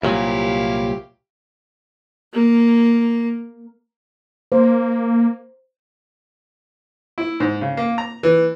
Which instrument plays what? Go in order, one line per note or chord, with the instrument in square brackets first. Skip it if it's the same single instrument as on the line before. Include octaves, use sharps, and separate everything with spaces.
[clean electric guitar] C2 A#2 F#3 [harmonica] E4 G4 F5
[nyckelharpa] A#3
[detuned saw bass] A#3 [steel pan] C5
[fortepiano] E4
G#2
C#3
A#3
A#5
E3